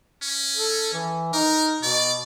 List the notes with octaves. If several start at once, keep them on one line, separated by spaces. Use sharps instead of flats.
C#4
A4
E3
D#4 A#4
B2 D5